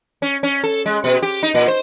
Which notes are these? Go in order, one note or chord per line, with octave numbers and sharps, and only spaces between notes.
C#4
C#4
A4
G#3
B2
G4
D#4
A#2
C5